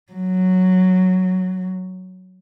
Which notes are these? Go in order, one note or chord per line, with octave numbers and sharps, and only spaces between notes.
F#3